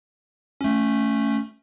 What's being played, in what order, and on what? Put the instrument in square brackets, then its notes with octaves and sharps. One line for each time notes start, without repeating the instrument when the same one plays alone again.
[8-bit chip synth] A3 C#4